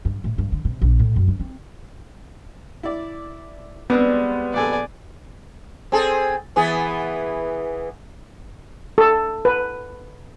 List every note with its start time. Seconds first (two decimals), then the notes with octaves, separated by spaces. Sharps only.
0.05 G2
0.24 A2
0.38 G2
0.52 D3
0.65 C3
0.82 A#1
1.00 A2
1.16 F#2
1.28 D4
1.40 C4
2.83 E4 D5
3.90 G3 G#3 B3 C4 D4 B4
4.54 A#1 A4 D5 G#5
5.92 C4 G#4 A4
6.56 E3 B3 G#4
8.98 A4
9.45 B4